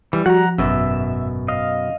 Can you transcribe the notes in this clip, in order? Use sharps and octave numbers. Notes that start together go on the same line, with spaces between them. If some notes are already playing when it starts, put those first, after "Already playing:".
E3 G3
F3 F#4 F#5 A#5
G#1 F#2 B2 E5
D#5 F5